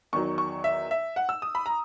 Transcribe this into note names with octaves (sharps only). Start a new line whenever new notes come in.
E2 D#3 F#3 C#6
C#6
E5
E5
F#5
E6
D#6
B5
A#5